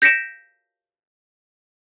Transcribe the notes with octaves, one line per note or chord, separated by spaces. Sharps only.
G6 A#6 B6 C#7 D7 E7